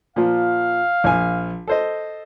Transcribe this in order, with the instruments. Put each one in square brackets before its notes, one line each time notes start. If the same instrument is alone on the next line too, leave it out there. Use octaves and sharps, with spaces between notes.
[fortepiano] A#2 F3 [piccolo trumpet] F5
[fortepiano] A#1 G#5
A4 C5 D#5